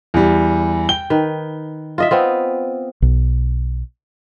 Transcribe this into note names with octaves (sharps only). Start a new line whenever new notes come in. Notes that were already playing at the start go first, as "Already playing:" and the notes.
E2 G3
G5 G7
D#3 B4
F4 D#5 E5
B3 C4 F4
B1